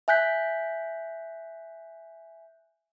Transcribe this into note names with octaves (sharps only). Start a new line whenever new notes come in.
E5 G#5 F#6 G6 B6